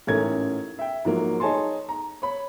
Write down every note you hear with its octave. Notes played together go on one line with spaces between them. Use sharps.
A1 G#2 A3 C#4 A#4 G#6
E5 G5
G#2 F3 F#3 A#3
D#4 G#4 C#5 G#5 A5 C6
A#5
C#5 B5